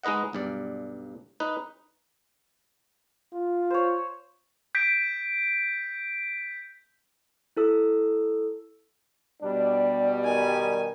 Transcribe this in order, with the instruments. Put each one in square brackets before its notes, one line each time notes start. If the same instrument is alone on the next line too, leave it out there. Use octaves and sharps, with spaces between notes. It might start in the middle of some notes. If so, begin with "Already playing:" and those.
[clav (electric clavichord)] G#3 D#4 B4 D#5 F#5
B1 G2 D5
D#4 B4
[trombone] F4
[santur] C5 C#5
[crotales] G6 B6 D7
[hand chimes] E4 A4 E6
[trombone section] B2 G3 [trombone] D4
[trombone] D#3 [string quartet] G#5